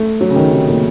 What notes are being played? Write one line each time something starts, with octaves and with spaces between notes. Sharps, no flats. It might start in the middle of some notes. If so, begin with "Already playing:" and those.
Already playing: A3
F#3
C#3
D#3
C3
A#2